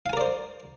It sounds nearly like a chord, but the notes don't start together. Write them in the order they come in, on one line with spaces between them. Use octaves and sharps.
F5 G#5 A#4 D5 C5